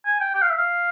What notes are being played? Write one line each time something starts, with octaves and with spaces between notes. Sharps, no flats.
G#5
G5
G5
F5
E5
F5